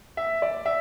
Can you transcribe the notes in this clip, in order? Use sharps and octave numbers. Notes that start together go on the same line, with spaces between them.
E5
D5
E5